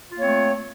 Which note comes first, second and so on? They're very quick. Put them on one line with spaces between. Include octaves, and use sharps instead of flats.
F4 A#3 C#5 C4 A3